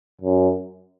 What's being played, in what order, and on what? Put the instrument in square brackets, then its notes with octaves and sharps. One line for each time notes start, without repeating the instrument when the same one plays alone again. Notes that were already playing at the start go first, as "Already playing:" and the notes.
[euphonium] F#2